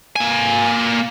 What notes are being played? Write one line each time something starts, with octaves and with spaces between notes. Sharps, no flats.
A#3 G#5